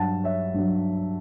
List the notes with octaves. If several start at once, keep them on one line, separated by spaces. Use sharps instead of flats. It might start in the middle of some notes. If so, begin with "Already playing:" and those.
Already playing: G2 F#3 F#5 A5
C#5 E5
G2 F#3